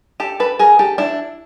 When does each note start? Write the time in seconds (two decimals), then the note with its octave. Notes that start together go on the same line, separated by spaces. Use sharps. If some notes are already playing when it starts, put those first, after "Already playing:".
0.20 G4 A4
0.40 A4 B4
0.59 G#4 A#4
0.79 G4 A4
0.98 D4 E4